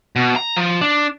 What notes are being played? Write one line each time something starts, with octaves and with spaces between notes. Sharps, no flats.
B2
A#5
F3
D4